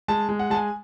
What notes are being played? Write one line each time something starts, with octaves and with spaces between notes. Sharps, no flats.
G#3 A5
G#3
F#5
G#3 G#5 A5